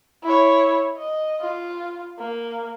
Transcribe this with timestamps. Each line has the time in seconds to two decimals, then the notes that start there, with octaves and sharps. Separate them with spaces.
0.23 E4 C#5
0.98 D#5
1.41 F4
2.19 A#3